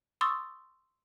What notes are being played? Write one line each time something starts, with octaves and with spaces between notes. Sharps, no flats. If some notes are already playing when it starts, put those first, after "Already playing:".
C6 C#6 D#6 E6 A6